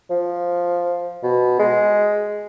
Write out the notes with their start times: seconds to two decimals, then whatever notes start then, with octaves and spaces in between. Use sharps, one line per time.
0.10 F3
1.23 B2
1.59 G#3